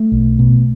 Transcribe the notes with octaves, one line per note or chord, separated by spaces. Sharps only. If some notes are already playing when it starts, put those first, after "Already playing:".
Already playing: A3
B1
B2